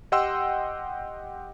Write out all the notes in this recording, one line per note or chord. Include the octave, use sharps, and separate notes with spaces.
G4 D#5 F#5 G5 C6 E6